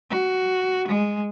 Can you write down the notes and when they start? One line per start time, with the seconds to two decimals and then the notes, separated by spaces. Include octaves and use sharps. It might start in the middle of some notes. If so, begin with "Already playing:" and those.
0.10 F#4
0.88 G#3